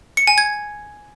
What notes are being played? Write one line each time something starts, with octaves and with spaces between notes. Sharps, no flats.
C#7
G#5
G#6